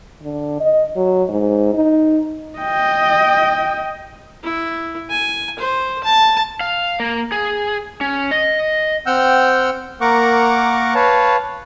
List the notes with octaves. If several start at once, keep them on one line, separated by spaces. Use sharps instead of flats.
D3
D#5
F#3
G#2
D#4
D#5 G5
E4
G#5
C5
A5
F5
A#3
G#4
C#4
D#5
C4 F#5 G5 E6 F6 G6
A#3 A#4 F#5 A#5 C#6 D6
B4 C#5 F5 A5